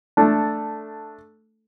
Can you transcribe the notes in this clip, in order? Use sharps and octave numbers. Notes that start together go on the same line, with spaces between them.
A3 D4 A4